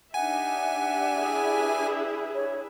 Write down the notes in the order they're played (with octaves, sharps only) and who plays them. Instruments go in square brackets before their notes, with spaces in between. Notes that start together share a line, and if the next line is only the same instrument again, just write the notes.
[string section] D4 G4 E5 [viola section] D#4 [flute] F#5 [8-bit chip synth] G#5
[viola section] E4 G#4 B4
[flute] C#5